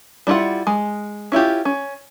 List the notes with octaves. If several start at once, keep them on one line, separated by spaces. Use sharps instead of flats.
G3 D4 E4 F4 F#5
G#3
C#4 E4 F4 G4
C#4